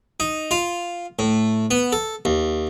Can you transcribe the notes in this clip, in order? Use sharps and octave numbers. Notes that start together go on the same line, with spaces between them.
D#4
F4
A2
B3
A4
D#2